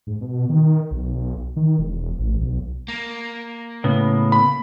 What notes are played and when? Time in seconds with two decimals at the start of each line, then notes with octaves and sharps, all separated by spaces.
0.07 G#2
0.21 B2
0.49 D#3
0.91 B1
1.56 D#3
1.78 E1
2.18 A1
2.41 B1
2.88 A#3
3.84 A2 C#3 B3
4.32 B5